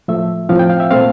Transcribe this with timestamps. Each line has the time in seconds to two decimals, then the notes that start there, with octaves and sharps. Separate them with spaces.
0.08 A2 F3 A3 E5
0.49 A2 F3 C4 F5
0.59 G5
0.70 F5
0.80 E5
0.91 A#2 A3 C4 F5